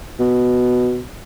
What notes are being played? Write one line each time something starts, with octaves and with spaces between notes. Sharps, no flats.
B2